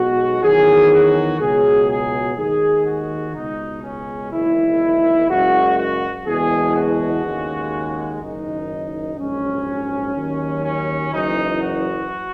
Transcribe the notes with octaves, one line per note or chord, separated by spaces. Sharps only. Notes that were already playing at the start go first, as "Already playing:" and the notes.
Already playing: B1 B2 G#3 F#4
E2 D#3 F#3 G#4
F#4
C#2 B2 F#3 G#4
G#4
D#2 D#3 G#3 G#4
F#4
C#2 B2 G#3 D#4
C#4
F#1 E2 D#3 G#3 E4
F#1 F#2 C#3 G#3 F#4
F#4
F#1 E2 B2 G#3 G#4
F#4
D#2 C#3 G#3
F#1 F#2 D#3 D#4
A#1 G#2 F#3 C#4
D#2 D#3 F#3
C#4
F#1 F#2 E3 D#4
F#4